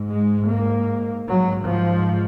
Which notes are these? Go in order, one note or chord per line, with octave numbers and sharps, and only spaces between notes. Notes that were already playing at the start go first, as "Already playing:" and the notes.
Already playing: G#2
G#3
A#3
G#2 F#3
F3